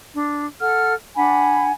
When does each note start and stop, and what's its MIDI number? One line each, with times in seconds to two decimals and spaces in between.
0.14 0.46 62
0.60 0.94 69
0.60 0.94 78
0.60 0.94 89
1.16 1.72 62
1.16 1.72 78
1.16 1.72 80
1.16 1.72 83